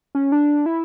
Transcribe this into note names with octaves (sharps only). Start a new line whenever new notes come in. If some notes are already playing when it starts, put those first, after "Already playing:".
C#4
D4
E4